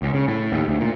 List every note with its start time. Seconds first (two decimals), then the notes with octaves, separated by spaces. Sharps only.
0.02 C#2
0.14 C#3
0.28 A2
0.52 D#2
0.68 D2
0.80 A#2